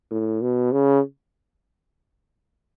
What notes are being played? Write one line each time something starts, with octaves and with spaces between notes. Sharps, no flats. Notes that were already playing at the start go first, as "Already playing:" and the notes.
A2
B2
C#3